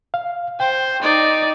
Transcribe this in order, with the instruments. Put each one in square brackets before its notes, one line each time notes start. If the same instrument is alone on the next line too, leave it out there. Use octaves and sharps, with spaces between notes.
[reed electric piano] F5
[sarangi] C5 [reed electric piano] G5
[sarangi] D#4 [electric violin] D5